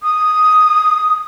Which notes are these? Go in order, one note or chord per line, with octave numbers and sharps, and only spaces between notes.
D#6